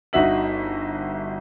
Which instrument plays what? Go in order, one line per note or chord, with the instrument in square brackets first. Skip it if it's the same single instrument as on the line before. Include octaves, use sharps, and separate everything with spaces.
[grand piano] G1 D#4 F#4 E5 F#7